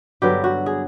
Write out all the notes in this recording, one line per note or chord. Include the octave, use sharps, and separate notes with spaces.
G2 D3 F#3 B3 G4
F#4
G#4